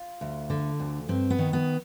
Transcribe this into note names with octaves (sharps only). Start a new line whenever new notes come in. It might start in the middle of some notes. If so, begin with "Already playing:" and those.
Already playing: F4
D2
D3
D2
G2 C4
B3
D#3
B3